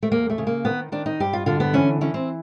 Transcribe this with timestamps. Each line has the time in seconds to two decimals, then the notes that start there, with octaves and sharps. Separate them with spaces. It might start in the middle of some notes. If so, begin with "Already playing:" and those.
0.03 A3
0.11 E2 A#3
0.30 A3
0.38 C#3
0.47 A#3
0.65 D#3 B3
0.92 D#3 D4
1.06 D#4
1.20 G2 G4
1.33 F4
1.46 D3 F4
1.60 B3
1.73 E3 C#4
2.01 E3 C#4
2.14 C4